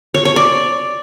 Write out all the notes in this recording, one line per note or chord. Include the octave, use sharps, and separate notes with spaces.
C#5
C#5
D5